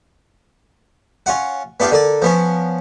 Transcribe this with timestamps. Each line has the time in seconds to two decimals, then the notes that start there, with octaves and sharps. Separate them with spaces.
1.26 C#4 F4 F#5
1.80 B3 D4 F4 G4 F5
1.92 D3 A#4 D5
2.22 F3 B3 C#4